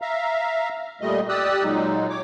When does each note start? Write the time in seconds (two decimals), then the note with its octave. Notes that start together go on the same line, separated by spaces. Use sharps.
0.02 E5 F5 A#5
1.01 A#2 G3 A3 D#5
1.29 G4 D5 D#6 E6 F#6
1.64 A#2 F#3 G#3 D#4
2.10 C#5 D6